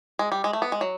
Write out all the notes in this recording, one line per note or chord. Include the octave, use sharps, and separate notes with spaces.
G#3
G3
G#3
A3
B3
G#3
F#3